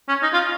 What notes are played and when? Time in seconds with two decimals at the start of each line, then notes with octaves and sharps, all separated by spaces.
0.08 C#4
0.22 D#4
0.33 F4